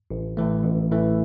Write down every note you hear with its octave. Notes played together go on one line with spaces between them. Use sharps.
A1
A2 E3 A3
A1
A2 E3 A3